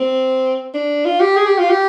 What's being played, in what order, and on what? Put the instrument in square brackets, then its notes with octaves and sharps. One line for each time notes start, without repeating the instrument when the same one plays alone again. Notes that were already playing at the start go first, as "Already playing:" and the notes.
Already playing: [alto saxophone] C4
D4
F4
G4
G#4
G4
F4
G4